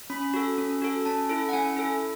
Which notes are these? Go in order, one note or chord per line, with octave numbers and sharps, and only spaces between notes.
C#4 B5
F#4 A4
C#4
F#4 A4
C#4 A5
E4 A4
F#5
C#4 G#5
E4 A4